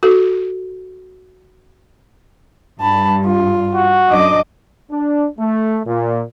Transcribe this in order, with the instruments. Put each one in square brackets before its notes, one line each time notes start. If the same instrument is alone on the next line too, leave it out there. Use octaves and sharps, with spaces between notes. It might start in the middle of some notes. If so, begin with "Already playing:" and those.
[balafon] F#4 A4
[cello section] G2 [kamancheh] A5 B5
[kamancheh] F4
[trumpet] F#4
[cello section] F#2 D#5 [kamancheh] D4 D6
[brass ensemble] D4
A3
A#2